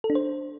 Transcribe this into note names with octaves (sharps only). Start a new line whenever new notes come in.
A4
D4
C5